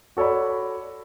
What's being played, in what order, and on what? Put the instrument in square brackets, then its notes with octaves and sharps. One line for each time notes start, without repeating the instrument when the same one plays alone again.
[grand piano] F#4 A4 C#5 D5 B5